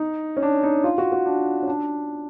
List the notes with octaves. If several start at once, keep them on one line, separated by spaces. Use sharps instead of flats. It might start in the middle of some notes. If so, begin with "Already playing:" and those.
Already playing: D#4
C#4
D4
D#4
F4
F#4
F#4
D4
C#4
D4